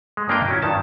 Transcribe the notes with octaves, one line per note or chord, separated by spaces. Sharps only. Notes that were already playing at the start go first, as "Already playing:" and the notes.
G#3
G2 A#3 D4 A#4 D#5 G5
F#3 C#4 E4
G2 D#3 A5